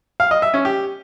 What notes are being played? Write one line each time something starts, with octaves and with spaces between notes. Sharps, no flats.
F5
D#5
E5
C#4
G4